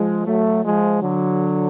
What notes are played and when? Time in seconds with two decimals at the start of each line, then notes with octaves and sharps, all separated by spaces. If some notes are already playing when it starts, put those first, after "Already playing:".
Already playing: F3 G#3
0.26 F#3 A3
0.65 F3 G#3
1.02 D3 F#3